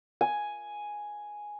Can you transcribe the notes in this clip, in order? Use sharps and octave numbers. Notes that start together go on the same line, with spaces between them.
G#5